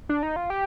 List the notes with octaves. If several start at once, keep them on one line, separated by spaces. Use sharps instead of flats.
D4
D#4
F4
G4